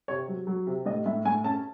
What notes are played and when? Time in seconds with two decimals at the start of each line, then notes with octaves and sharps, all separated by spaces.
0.08 C3 C#5
0.28 F#3
0.47 F#3
0.67 C3
0.86 A2 D#5
1.06 A2 E5
1.25 A2 G#5
1.44 C#4 A5